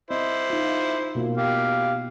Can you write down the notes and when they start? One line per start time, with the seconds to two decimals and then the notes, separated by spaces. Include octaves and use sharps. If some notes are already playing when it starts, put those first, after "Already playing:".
0.11 C4 E4 C5 D#5
0.50 D#4 F4
1.15 B2 A#3 F4
1.37 G4 F5